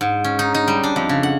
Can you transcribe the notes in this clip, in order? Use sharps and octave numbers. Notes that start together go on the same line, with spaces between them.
G#2
C#4
D#4
D#4
G3
D4
F2
C#3
F#5